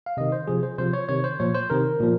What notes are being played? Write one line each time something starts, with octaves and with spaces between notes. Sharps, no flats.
F5
C3 D#3 D#5
C5
C3 F3 G#4
C5
C3 F3 C5
C#5
C3 D#3 C#5
C5
A#2 F3 C#5
C5
C3 D#3 A#4
A#2 F3